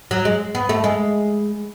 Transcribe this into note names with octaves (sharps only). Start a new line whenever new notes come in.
F#3
G#3
B3
A3
G#3